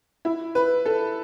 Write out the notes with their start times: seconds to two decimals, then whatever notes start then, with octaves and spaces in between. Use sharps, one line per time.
0.25 E4
0.55 B4
0.85 A4